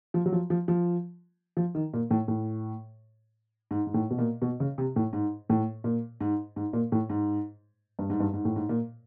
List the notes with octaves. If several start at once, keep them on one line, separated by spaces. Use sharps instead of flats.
F3
F#3
F3
F3
F3
F3
D#3
A#2
A2
A2
G#2
G#2
A2
B2
A#2
B2
C#3
C3
A2
G#2
A2
A#2
G#2
G#2
A#2
A2
G#2
G2
G#2
G2
G#2
A2
G#2
A#2